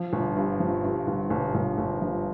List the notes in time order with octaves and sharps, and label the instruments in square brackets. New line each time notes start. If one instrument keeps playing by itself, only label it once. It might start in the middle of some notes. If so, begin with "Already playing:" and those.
Already playing: [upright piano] F3
G1
G2
F3
G2
G1
G1
G1
G1
F3